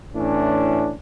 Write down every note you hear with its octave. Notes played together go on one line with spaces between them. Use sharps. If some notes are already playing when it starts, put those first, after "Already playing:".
A2 E3 C#4 D4